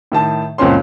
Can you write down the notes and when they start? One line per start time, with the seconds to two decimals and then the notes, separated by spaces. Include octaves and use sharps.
0.12 A2 D#3 A5
0.58 F#1 C#2 A#2 C4 C#4 C6